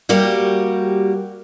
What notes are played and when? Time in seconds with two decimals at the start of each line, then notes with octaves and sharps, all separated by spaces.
0.09 G3 A#3 F#4 G4